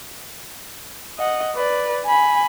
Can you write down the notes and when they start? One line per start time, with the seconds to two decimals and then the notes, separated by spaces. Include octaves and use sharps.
1.18 D#5 F#5
1.56 B4 D5
2.05 G#5 B5